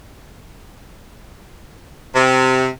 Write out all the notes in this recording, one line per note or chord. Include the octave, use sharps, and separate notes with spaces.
C3